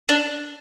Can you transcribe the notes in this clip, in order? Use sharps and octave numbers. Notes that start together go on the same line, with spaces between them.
D4